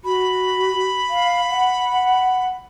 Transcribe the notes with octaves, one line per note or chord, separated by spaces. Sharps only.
F#4 B5
F5
F#5